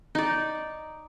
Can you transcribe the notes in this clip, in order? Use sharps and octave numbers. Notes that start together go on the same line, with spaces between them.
D#4 D5